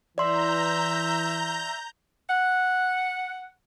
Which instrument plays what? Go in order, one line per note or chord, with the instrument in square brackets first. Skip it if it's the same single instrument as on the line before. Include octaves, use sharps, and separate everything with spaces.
[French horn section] E3 [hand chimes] D5 C6 [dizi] E5 [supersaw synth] A#5 G6
[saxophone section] F#5